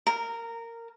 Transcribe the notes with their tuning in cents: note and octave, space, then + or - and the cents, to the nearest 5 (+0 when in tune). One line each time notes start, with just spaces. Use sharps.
A#4 -15